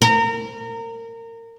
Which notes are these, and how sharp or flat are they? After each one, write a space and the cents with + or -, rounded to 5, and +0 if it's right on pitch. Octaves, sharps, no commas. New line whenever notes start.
A#4 -25